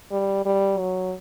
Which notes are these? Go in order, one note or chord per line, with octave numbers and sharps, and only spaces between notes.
G3
G3
F#3